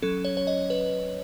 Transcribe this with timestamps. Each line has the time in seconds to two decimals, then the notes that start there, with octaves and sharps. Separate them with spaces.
0.02 F#3 C#4 A4
0.25 C#5
0.37 C#5
0.47 D#5
0.70 B4